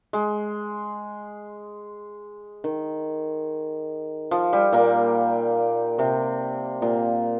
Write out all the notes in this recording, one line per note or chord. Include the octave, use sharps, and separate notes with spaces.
G#3
D#3
F3
G3
A#2 A#3
C3 C4
A#2 A#3